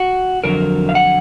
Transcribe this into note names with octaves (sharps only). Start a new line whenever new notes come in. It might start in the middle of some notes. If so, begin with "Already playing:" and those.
Already playing: F#4
F2 D3 F#3 A#4
F5
F#5